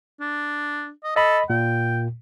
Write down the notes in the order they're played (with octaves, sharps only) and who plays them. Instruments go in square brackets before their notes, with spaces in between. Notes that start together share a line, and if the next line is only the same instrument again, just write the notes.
[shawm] D4
D#5
[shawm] A4 [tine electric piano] D#5 B5
[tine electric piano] A#2 [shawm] G5